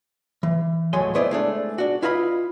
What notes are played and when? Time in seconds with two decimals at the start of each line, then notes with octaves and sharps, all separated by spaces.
0.43 E3
0.93 C#2 A2 F#3 G#5 C6
1.15 G#3 B3 E4 B4 C5 D5
1.31 G#3 A3 D4
1.78 D4 F#4
2.02 E4 F4 B4 D#5 A#5 B5